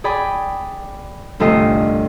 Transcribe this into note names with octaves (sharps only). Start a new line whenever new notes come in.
G#4 D5 G5 B5
G1 C2 A3 C4 F4 D#5